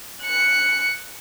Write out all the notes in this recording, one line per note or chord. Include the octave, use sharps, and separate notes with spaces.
F#6 C#7